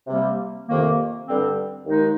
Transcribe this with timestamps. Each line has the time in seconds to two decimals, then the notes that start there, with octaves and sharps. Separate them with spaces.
0.07 C3 G3 A#3
0.68 F2 C3 D#3 A#3
1.27 G2 D3 G3 C4
1.86 D#2 D#3 G#3 D#4